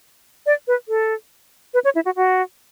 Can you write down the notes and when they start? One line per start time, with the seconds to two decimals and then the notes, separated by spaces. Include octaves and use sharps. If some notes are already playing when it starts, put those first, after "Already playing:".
0.46 D5
0.68 B4
0.89 A4
1.74 B4
1.84 C#5
1.95 E4
2.05 F#4
2.16 F#4